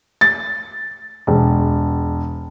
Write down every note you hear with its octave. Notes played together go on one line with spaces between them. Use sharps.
A6
E1